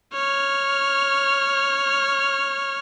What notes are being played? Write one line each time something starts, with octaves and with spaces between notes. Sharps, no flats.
C#5 F6